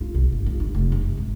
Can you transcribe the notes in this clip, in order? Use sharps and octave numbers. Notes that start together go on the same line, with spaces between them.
F4
B1
G1
F4
G1
F1
F#2
F#2
G#1